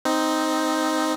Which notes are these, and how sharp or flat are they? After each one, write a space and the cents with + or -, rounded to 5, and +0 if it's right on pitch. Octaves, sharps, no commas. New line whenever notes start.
C4 -5 D#4 +5